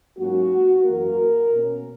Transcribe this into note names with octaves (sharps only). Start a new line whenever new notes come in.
G#2 F#3 A#3 C#4 F#4
F#2 E3 A#3 A#4
B2 A#3 C#4